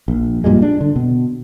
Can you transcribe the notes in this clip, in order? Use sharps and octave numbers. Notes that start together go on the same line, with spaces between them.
A#1
G2 A#2 G3 G#3
D4
D3
B2